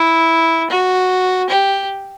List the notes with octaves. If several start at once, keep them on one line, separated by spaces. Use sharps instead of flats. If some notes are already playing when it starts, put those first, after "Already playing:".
Already playing: E4
F#4
G4